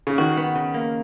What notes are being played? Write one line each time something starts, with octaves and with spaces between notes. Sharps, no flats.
C#3
D#3 F#4
B3
C#3
A#3